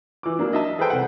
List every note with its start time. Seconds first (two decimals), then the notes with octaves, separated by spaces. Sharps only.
0.23 E3 D6
0.39 F#3 A#3 D4
0.53 D#5 E5 A5
0.79 G#4 A4 B4 C5 G5 A5
0.90 C2 F#5